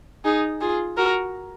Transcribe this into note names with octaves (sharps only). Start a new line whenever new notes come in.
D#4 G#4
F4 G#4
F#4 A#4